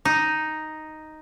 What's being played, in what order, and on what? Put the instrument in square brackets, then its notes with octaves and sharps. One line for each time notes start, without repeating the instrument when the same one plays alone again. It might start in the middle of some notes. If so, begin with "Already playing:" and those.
[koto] D#4